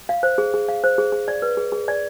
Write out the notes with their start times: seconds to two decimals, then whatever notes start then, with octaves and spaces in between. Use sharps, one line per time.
0.09 F5
0.23 C5
0.38 G#4
0.54 G#4
0.69 F5
0.84 C5
0.98 G#4
1.12 G#4
1.28 D5
1.42 B4
1.57 G#4
1.72 G#4
1.88 D5